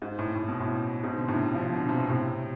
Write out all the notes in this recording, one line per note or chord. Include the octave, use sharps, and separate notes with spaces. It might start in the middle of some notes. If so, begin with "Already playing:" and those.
G#2
A2
A2
B2
A2
G#2 B2
D3
A2 C3
D3 F3
B2 D3
C3
B2
A2 C3